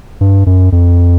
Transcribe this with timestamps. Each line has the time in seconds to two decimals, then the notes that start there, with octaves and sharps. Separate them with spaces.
0.21 G2
0.46 F#2
0.72 F2